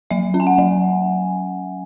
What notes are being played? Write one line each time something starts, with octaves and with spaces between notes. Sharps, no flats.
F#3 E5
C#4
G#5
F#5
F#3